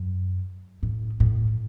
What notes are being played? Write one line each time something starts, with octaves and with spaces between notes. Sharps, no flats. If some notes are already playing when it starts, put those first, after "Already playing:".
Already playing: F#2
A2
A2